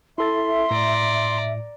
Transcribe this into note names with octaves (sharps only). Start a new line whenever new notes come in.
E4 A4 E5 C6 A6
A2 D5 A#5